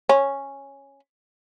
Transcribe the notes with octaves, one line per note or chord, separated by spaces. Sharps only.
C#4